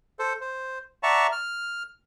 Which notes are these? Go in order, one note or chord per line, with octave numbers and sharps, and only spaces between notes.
A4 C5
C5
D5 E5 F#5 A5 A#5 C#6
F6